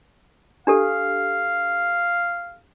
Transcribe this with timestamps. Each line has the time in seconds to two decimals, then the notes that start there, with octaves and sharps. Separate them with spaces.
0.67 D4 G4 A4 F5